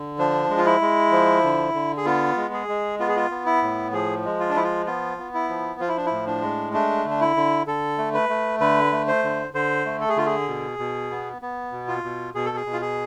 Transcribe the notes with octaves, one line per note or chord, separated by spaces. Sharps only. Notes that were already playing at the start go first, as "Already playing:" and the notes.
Already playing: D3
F3 D4
G#3
F4
E4
G#3
F3
D3
D3
G#4
B3 F4
G#3
G#4
G#3
B3 F4
G#4
F4
B3
E4
A2
F3 G#4
G#3
F4
D4
F3 E4
F4
B3 F4
B3
E4
F3
F3 F4
E4
D4
E4
A2
D4
G#3
A3 D4
D3 D4
E4
D3
D3 A4
A3
B4
A3
D3 B4
A3
C5
D3
D3 C5
A3
A4
G#4
D3 F4
G#4
B2
B2
B3
B3
B2
F4
B2
B2 G#4
A4
G#4
B2
F4
G#4